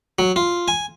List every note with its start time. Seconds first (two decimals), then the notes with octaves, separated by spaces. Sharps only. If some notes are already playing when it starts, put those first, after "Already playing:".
0.19 F#3
0.36 F4
0.68 G#5